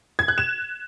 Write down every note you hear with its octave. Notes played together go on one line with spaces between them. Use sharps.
G#6
F#6
E7